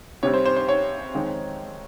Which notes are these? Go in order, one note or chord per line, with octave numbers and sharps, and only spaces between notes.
C3 G3 C4 C#5
C5
C5
C5
C#5
F2 D#3 G#3 C4 D#4